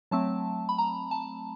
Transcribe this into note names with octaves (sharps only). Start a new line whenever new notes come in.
F#3 A3 C4 A5
B5
A#5
A5